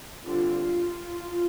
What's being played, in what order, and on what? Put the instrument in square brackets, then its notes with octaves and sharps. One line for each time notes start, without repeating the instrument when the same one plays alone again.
[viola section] D3 G3 C4 F4